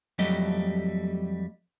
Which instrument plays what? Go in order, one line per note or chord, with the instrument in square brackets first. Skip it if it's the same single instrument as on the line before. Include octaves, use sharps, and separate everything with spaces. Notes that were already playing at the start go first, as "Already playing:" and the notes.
[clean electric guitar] F2 F#3 G3 A3 G4 D#5